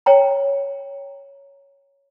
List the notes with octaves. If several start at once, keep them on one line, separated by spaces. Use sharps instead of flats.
C#5 G5 A#5